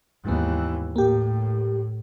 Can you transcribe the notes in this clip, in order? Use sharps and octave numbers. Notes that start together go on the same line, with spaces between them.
D#2 G#2 E3 B3
A2 A#3 G4